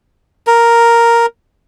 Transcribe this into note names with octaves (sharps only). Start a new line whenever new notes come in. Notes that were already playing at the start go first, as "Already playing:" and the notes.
A#4